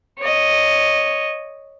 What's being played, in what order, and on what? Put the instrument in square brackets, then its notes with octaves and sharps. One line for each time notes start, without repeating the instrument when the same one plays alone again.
[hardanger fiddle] C#5 D#5